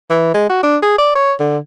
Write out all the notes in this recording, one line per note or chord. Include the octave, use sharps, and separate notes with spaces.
E3
G#3
F#4
D4
G#4
D5
C#5
D3